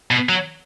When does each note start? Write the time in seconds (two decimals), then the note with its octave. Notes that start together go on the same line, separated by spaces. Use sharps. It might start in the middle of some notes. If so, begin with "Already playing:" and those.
0.11 B2
0.29 F#3